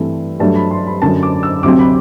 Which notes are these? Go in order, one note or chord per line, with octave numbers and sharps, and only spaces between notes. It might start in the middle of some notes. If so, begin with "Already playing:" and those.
Already playing: G2 E3 A3 C4
G2 F#3 A3 D4 A5
B5
C6
B5
F#2 D3 F#3 A5
D6
E6
D2 C3 F#3 C4 D6
B5